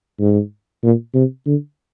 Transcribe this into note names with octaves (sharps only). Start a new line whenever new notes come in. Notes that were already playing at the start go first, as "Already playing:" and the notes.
G#2
A#2
C3
D3